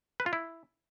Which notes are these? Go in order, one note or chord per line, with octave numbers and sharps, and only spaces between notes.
B4
F4
E4